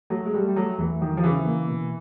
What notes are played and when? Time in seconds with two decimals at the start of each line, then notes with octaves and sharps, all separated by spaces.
0.10 F#3 A3
0.26 G#3
0.34 G3 A3
0.47 G3
0.56 F#3 A3
0.79 E2 E3
1.01 D#3 F#3
1.17 F3
1.23 C#3 E3
1.45 A#3
1.68 B2